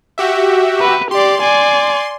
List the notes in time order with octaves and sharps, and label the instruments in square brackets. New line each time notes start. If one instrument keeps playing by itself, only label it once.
[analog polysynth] F#4 G4 E5
[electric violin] B4
[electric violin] G4 D5 [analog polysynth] C6
[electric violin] D5 G#5